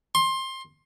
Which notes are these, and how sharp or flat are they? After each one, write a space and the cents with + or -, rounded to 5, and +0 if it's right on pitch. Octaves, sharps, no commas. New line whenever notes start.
C6 +20